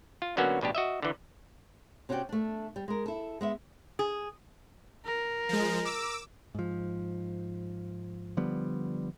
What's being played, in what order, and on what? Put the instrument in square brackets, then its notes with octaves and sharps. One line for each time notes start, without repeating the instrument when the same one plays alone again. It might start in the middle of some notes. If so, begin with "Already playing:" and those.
[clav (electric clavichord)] F4
D3 F#3 A#3 B3 C#4 F#4
A1 B2 D4 G4
F#4 D#5 E5
D3 E3
[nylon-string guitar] C3 C#4 F#4 C5 D5 G5
A3 D4
G3
G#3 A#4
E4 A4
G#3 B3 E5
[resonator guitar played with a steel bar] G#4
[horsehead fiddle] A#4
[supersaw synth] F3 G#3
D6 E6
[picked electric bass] G#2 F3
D3 F3 G3 B3